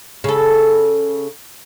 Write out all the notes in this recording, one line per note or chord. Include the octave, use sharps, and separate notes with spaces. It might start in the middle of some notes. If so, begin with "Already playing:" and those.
C#3 A4